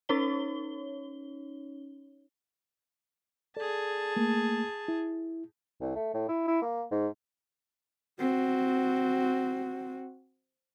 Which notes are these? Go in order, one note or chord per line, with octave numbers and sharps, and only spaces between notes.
C#4 D#4 C#5 G7
G#4 A4 D5 A5
A3 A#3
E4
C2
A3
A2
E4
E4
A#3
G#2
C4 F#4